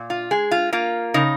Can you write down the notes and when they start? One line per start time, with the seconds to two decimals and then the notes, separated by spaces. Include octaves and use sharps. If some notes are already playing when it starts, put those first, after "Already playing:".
Already playing: A#2
0.10 F4
0.31 G#3 G#4
0.51 F4
0.73 A#3 F4
1.14 C#3 D#4